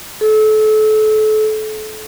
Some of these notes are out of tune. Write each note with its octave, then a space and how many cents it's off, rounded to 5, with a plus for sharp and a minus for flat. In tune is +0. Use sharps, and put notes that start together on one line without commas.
A4 -30